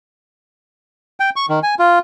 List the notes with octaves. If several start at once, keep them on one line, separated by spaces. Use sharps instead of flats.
G5
C#6
D#3
G#5
F4